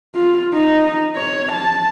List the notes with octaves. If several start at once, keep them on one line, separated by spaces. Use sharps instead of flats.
F4
D#4
C#5
A5